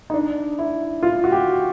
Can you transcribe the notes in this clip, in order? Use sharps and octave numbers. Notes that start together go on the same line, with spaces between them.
D#4
D4
E4
F4
F#4
G4